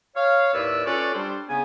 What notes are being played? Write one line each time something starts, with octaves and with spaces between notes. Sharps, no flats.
C#5 F5
D#2 A2 B4 D5 E5 E6
C#4 F4 A4 B4 C#5 D5
G3 D4 C5
C#3 B3 G#5